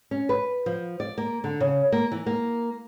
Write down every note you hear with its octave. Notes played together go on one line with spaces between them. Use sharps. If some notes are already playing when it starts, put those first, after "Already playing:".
C#4
B4
F3
D5
A#3
D3
C#3
A#3
E3
A#3